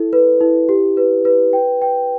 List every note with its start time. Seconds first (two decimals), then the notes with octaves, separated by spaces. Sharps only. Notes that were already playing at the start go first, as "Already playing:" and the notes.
Already playing: E4 A4
0.13 B4
0.41 E4
0.69 G4
0.97 B4
1.25 B4
1.53 G5
1.82 G5